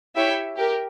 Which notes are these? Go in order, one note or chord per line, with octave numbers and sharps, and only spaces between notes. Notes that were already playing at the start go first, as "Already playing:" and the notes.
E4 G4 C#5 E5 G5
G4 A#4